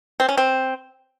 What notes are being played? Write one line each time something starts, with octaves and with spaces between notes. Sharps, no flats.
C4
C#4
C4